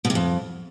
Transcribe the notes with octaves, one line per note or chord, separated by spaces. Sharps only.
B2
C3
F2